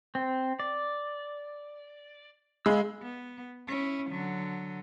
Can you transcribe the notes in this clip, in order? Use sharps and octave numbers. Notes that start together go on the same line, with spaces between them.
C4
D5
G#3 F5 B5 E6
B3
C#4 E4
D3 F#3